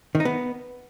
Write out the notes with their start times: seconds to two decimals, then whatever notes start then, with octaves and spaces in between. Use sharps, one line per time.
0.15 D#3
0.20 D#4
0.25 B3